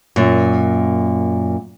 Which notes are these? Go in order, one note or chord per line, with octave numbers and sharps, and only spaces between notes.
F#2 A#2